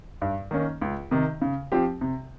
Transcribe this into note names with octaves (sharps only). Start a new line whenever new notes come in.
G2
D#3 A#3 C#4
C#2
C3 D#3
C#3
F3 C4 G4
C3